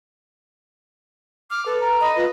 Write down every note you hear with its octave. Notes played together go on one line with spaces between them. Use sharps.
D6 F6
A4 B4
A#5
D#5 B5
F4 B4